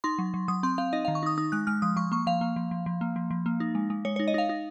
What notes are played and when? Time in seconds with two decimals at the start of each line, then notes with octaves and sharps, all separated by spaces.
0.04 D#4 C6
0.19 F#3
0.34 F#3
0.48 F#3 D#6
0.63 C4 C6
0.78 C4 F5
0.93 D#4 D#5
1.05 D#3 F5
1.15 C#6
1.23 D#4 D#6
1.38 D#4 D#6
1.52 G#3 F#6
1.67 G#3 F6
1.82 F3 D#6
1.96 F3 C#6
2.12 A#3 C#6
2.27 F3 F5
2.41 A#3
2.56 F3
2.71 F3
2.86 F3
3.01 A#3
3.16 F3
3.31 F3
3.46 A#3
3.60 D#4
3.75 G#3
3.90 G#3
4.05 G#3 C#5
4.16 D#4 C#5
4.28 D#5
4.34 D#4 F5
4.49 D#4